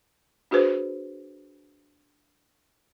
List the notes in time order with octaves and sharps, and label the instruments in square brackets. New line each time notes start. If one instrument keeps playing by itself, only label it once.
[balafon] D4 F#4 G#4 B4 C5